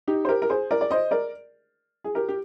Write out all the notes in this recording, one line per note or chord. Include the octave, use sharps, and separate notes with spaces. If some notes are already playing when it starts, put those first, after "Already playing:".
D#4 G4
C5
G4 A#4
A#4
G#4 C5
A#4 D5
D5
C5 D#5
A#4 D5
G#4
G4 A#4
G4